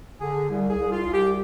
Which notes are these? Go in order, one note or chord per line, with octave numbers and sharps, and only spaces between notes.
D3 G#4
C2
G#4
C2
F4
C2
G4